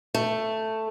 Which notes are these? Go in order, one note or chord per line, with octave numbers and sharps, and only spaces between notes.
A3